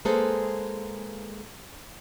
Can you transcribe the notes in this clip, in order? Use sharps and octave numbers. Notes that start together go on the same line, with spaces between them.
G#3 A#3 G#4 A4 B4 C5